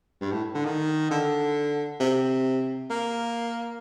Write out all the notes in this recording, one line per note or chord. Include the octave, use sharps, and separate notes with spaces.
G2
A2
D3
D#3
D3
C3
A#3